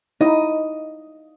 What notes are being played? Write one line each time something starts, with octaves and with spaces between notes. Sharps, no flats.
D#4 E4 D#5